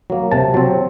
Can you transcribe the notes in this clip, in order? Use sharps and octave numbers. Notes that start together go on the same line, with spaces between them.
F#3 A#3
C3 A5
F#3 C4